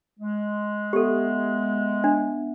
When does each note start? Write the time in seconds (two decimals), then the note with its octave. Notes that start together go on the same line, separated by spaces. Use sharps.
0.19 G#3
0.93 B3 G4 A4 E5 F#5
2.04 D4